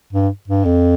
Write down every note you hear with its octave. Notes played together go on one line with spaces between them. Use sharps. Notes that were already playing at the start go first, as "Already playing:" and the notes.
G2
G2
F2